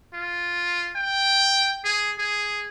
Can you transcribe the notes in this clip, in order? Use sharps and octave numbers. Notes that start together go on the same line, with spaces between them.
F4
G5
G#4
G#4